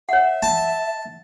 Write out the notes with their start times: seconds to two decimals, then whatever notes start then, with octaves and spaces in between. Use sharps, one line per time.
0.09 C#5 E5 F#5
0.43 A5